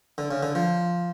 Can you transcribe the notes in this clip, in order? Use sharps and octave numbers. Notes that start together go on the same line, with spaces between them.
D3
C#3
D3
F3